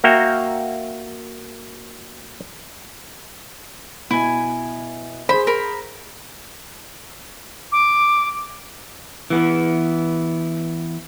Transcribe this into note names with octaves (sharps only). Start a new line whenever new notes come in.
A#3 F#4 E5 G5 A#5
B2 E4 G#5
G#4 C5 B5
A#4 B5
D6
E3 B3